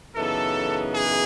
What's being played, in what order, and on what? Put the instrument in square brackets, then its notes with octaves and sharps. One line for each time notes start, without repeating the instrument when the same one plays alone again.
[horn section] F#2 C#3 E3 B3 D#4 A4
G#4